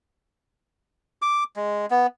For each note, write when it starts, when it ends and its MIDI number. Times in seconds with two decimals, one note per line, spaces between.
1.22 1.44 86
1.56 1.86 56
1.90 2.07 59